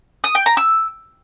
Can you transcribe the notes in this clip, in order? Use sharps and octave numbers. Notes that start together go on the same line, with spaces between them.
D#6
G5
A#5
E6